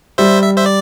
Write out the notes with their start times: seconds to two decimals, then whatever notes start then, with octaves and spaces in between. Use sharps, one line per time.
0.18 G3 C5 E5
0.42 E5
0.57 C5 E5
0.66 D5